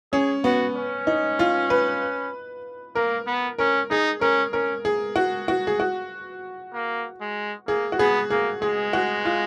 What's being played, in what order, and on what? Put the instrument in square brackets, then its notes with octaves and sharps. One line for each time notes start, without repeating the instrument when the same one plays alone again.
[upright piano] C#4 [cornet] G#4
[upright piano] B3 [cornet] F#4
[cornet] C#4
[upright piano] D#4
F4
B4
[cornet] A#3 [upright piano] A#4
[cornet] B3
[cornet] C#4 [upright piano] A#4
[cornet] D#4 [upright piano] G#4
[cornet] C#4 [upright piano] A#4
[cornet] C#4 [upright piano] A#4
[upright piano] G#4
F#4
F#4
G#4
F#4
[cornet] A#3
G#3
[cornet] A#3 [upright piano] G#4
[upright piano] F#4
[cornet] B3 [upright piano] G#4
[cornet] A#3 [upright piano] G#4
[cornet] G#3 [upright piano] G#4
[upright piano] F#4
F4